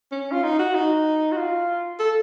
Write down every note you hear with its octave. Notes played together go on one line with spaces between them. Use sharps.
C#4
F4
D#4
F#4
D#4
F#4
F4
A4